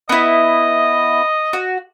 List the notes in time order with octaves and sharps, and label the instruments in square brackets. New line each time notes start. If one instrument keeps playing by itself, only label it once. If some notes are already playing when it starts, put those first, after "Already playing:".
[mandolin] B3 E4 [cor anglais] D#5
[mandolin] F#4